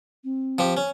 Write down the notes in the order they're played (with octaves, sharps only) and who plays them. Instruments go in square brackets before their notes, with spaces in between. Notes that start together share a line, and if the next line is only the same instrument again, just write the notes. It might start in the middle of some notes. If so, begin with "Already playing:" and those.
[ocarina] C4
[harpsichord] F3 G4
C#4